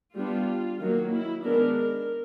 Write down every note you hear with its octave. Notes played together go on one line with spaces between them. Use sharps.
G3 B3 D4 F4
D#3 F#3 A#3
E4
D#3 G#3 B3 D4 A#4
A#4